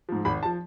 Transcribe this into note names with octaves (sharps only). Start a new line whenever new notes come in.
G#2 F3
G#1 B5
A5
F3